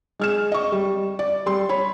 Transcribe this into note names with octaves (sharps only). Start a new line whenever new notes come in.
G#3 F6 E7
D#5 C#6
G3
D5
G3 C6
C#5 B5